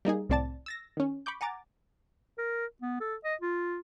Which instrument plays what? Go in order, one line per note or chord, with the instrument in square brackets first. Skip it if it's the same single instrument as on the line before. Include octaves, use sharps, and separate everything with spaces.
[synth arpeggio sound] G3 A#3 D#4 G#4
C2 A2 C4 D5 A5 A6
E6 A6 A#6
D#3 C#4
B5 C#6 D6 G6
F#5 G#5 A#5 D6 A6
[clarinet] A#4
B3
A4
D#5
F4